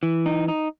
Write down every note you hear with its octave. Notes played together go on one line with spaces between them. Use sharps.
E3
D#4
D#4